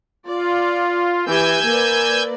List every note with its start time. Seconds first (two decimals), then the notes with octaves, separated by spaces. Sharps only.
0.26 F4 D5
1.26 E3 G4 G#5 E6 G6
1.65 A#3 B4 D5